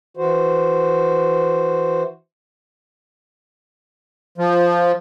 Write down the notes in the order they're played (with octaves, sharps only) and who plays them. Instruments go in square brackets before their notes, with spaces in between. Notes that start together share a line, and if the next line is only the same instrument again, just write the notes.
[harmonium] E3 F#4 C5
[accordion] F3